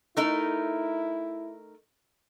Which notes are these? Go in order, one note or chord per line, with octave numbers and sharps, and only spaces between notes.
A3 D#4 E4 A#4